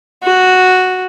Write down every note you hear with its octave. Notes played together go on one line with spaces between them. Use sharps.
F#4